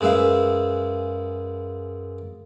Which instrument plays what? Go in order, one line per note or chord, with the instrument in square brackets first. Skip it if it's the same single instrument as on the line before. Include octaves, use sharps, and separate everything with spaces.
[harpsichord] F#2 G#3 B4 E5 F5